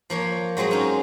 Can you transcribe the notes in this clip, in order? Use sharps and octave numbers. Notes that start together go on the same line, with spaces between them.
F3 A#3 C#5
F#3 G#3 C4 G#4 D#5
C#4 D#4